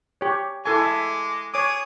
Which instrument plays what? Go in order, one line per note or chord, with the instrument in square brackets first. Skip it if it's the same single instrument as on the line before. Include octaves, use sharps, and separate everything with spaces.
[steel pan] G4 C#5
[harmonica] G#3 D6 [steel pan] E4 A4 G#5
[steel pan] E5
[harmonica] G#4 D#6 [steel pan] C#5 D6